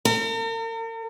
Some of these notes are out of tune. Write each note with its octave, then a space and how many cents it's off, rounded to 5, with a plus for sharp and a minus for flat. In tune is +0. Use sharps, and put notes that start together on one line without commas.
A#4 -45